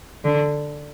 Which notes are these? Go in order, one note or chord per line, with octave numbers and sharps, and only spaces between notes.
D3